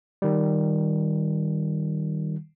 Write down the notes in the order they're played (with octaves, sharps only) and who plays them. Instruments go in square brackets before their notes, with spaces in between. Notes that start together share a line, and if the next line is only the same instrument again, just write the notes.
[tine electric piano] D#3 G3